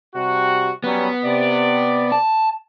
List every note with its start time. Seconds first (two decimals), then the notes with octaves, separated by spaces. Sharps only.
0.15 C3 G3 F#4
0.84 F#3 G3 B3 C#4
1.24 C3 D5
2.12 A5